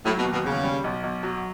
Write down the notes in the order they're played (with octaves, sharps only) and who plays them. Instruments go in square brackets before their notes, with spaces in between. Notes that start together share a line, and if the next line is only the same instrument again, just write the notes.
[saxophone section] A2 [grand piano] F#3
[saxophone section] B2
[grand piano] D#2
[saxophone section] B2
[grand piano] E2 [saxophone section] C#3
[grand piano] G3
B1
B1
F#3